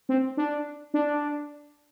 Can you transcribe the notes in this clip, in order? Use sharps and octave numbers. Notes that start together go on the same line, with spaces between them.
C4
D4
D4